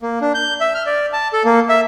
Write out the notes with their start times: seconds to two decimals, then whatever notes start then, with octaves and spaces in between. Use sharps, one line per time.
0.02 A#3
0.21 D4
0.35 G6
0.61 E5
0.75 F6
0.86 D5
1.13 A5
1.33 A4
1.45 A#3
1.69 E5